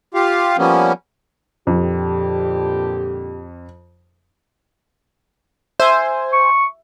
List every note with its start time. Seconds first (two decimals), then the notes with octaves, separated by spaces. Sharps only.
0.14 F4 G4 F5
0.58 F3 G3 A#3 B3 C#4
1.67 F2 A#2 D3 G4
5.80 C5 E5 G#5
6.33 C#6